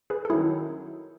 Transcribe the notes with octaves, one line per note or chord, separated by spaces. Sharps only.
G#4 B4
A4
D#3 F#3 C#4 E4 G#4